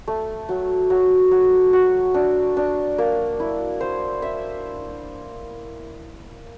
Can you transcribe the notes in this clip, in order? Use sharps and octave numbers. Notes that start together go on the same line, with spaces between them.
A3
F#3
F#3
F#3
F#4
D4
D4
A#3
E4
C5
E5